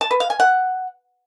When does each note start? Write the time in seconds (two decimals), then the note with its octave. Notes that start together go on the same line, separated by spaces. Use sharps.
0.01 A5
0.11 B4
0.20 F5
0.30 G#5
0.40 F#5